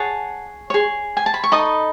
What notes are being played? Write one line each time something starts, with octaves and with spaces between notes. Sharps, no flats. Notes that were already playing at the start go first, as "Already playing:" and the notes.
Already playing: G#4 C#5 F#5 A5
G#4 C#5
G#5
A5
B5
C#6
D#4 A4 D#5 B5 D#6